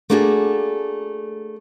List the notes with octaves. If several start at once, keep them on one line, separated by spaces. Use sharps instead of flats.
A3 A#3 D4 F#4 G#4